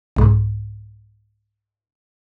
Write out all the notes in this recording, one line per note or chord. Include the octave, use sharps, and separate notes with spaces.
C2 G#2